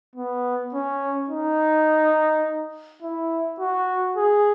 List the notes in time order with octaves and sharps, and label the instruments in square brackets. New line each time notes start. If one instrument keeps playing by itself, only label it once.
[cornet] B3
C#4
D#4
E4
F#4
G#4